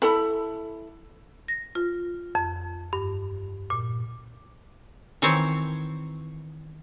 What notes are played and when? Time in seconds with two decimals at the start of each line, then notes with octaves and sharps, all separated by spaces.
0.02 E4 A4 B5
1.48 A#6
1.75 F4
2.35 F2
2.93 G2
3.70 A#2
5.22 D#3 E3 C4 C5 C#5